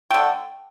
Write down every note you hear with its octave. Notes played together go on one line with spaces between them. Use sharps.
D3 A3 G5